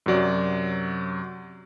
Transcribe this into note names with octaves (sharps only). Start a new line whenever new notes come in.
F#2 C3 F#3 D5